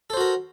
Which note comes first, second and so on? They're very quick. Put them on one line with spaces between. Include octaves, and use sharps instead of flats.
A4 C5 F#4 A#4